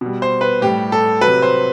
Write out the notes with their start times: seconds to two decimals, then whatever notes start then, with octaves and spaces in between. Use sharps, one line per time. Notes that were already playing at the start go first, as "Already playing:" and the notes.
0.01 B2 G3
0.22 C5
0.41 B4
0.62 A2 G3 G4
0.92 A4
1.21 C3 F#3 B4
1.42 C5